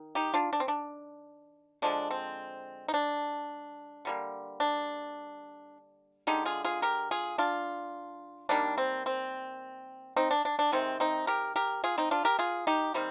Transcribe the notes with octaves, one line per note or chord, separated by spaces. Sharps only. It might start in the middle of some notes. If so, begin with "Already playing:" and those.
Already playing: D#3
D#4 G4
D4 F4
D4
C4
D4
D3 F3 G#3 D4
C4
D#4
D4
D3 G3 A#3
D4
D3 G#3 D#4 G4
F4 G#4
F4 G#4
G4 A#4
F4 G#4
D4 F4
D#3 G3 A#3 D4
C4
C4
C4 D#4
D4
D4
D4
C3 D#3 G#3 C4
C4 D#4
G4 A#4
G4 A#4
F4 G#4
C4 D#4
D4 F4
G4 A#4
F4 G#4
D#4 G4
D#3 G3 A#3 C4